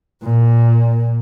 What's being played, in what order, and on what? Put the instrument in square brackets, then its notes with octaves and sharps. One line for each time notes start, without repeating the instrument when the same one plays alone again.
[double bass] A#2